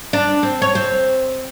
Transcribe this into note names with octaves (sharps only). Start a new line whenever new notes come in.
D4
C4
C#5
C4